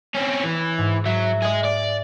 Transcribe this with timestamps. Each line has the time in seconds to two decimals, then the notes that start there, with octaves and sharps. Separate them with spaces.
0.14 C4 C#4
0.44 E3
0.78 G#2
1.06 F#3 E5
1.42 G#4 D#5
1.64 D5